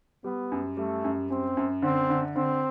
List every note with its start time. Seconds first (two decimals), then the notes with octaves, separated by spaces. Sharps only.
0.24 G3 B3
0.52 F#2
0.77 G3 A3
1.04 F#2
1.30 F#2 C4
1.57 F#2
1.82 D3 C4
2.09 D3
2.36 D3 C4